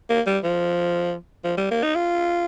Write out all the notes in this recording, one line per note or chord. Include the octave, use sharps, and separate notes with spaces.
A#3
G3
F3
F3
G3
A#3
D#4
F4